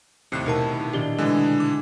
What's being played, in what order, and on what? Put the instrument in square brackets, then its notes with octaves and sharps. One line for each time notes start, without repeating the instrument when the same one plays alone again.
[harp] D#2 [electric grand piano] A2 C3 [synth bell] F#6 C7 C#7
[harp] B2 E4 [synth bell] D#4 A#4 A5
[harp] A#2 D#3 D4 [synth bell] G4 G7
[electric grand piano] D3 E3 [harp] G#3 A3
[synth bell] D6